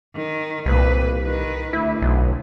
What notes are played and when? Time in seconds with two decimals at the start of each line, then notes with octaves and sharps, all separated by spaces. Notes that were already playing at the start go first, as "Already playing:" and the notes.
0.15 D#3
0.66 C2 A#2 B4
1.22 D#3 B4
1.73 D2 E4
2.02 B1